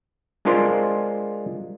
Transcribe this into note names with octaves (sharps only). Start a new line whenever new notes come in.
G#3 D4 F4 A#4 C5 D5